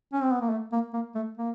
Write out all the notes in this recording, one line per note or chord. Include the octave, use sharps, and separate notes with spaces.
C#4
C4
B3
A#3
A3
A#3
A#3
A3
A#3